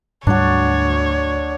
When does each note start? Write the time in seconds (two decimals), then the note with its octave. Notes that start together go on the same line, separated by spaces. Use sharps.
0.27 D2 G#2 F#3 G3 D4 C#5